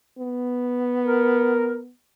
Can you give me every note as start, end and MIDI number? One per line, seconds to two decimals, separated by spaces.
0.19 1.89 59
1.03 1.78 70